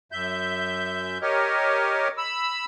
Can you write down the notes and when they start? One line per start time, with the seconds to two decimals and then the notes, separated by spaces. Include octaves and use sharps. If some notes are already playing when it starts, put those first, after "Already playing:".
0.12 F#2 E5 G6
1.22 G4 A#4 C#5 D#5
2.18 B5 E6